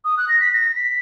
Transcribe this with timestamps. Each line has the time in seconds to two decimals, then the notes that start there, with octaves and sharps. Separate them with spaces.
0.05 D#6
0.18 F#6
0.29 A#6
0.40 B6
0.53 A#6
0.76 B6